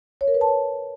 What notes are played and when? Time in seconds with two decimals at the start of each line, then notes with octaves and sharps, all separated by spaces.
0.21 C#5
0.28 A#4
0.34 B4
0.41 A5
0.48 C#5